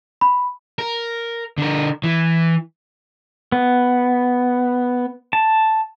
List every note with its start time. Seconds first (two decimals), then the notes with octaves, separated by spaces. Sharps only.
0.21 B5
0.78 A#4
1.58 D3 A#4
2.04 E3
3.52 B3
5.33 A5